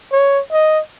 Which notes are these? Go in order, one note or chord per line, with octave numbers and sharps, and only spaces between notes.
C#5
D#5